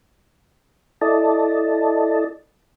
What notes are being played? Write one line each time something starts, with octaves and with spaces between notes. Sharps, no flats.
E4 A4 D5 D#5 A5